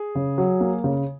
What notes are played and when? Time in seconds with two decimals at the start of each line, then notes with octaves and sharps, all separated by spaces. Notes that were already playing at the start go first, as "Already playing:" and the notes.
Already playing: G#4
0.15 C#3
0.38 F#3
0.61 A#3
0.84 C#3